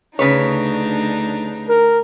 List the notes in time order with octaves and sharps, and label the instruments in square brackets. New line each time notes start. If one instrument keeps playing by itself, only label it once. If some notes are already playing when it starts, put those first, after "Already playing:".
[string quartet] D2 D4 D#4 [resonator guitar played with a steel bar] C#3 B4 C#5
[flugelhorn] A#4